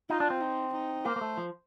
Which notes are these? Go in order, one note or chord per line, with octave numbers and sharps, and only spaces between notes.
D#4 F4
D4
C4
D#4
D#4
A#3 C5
A#3
A3
F3